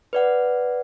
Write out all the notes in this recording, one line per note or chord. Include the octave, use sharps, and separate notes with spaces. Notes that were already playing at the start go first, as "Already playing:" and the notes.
B4 D5 F#5